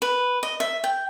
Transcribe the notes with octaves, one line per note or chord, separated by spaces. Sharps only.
B4
D#5
E5
G5